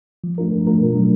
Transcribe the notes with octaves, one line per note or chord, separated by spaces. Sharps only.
F3
A3 D4 F4 A#4
F3
A3 D4 F4 A#4
B2
F#3 A3 D4